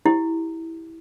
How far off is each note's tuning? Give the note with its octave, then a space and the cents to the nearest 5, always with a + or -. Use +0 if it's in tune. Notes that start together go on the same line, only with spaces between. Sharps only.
E4 -10 G4 +0